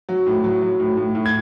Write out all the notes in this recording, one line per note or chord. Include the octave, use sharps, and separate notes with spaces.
F#3
A2
F#3
F#3
A2
A2
A2
G#6